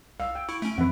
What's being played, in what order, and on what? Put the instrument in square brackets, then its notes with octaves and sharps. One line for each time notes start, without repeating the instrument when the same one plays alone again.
[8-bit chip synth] C2 [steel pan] F5 [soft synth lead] E6
[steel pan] G5
[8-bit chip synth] E4 [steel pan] C#6 [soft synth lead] D7
[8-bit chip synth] A3 C#4
[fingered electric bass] F2 E3 [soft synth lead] C4 [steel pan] B4 E5 F#5